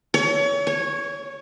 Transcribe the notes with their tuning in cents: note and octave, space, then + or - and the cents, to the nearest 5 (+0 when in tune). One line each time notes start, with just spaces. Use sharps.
C#5 +30
C#5 -10